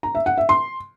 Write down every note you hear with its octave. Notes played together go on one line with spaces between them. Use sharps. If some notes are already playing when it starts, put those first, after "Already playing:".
A#5
E5
F#5
E5
C6